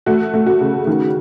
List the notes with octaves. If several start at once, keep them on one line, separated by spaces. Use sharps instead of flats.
A3 F#4
A3
F#4
C#3
D#3